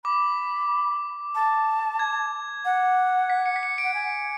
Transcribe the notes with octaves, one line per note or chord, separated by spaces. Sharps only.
B5 D6
A5
G#6
F#5
B6
C#7
B6
C#7
D7
F#5
G#5